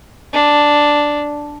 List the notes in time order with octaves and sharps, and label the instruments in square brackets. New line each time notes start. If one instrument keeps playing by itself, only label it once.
[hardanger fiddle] D4